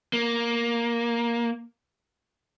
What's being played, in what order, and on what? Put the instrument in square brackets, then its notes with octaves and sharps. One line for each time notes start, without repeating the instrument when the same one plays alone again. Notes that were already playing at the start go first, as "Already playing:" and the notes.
[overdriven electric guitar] A#3